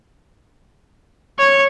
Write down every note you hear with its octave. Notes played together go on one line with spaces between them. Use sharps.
C#5